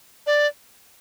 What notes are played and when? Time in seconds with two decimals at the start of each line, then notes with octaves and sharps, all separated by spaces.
0.27 D5